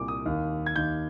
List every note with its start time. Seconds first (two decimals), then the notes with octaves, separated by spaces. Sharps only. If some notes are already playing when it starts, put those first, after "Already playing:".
Already playing: C2 A#2 D6
0.08 D#6
0.25 D#2 D#3
0.66 G#6
0.75 D#2 D#3 G6